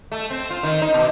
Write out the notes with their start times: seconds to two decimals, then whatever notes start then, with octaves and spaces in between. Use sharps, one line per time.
0.12 A3
0.30 C4
0.50 F4
0.63 D#3
0.82 D#4
0.94 B2